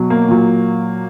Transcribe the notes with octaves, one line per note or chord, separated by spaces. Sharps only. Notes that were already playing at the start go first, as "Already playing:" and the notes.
Already playing: B2 F#3
A#3
A#2 F#3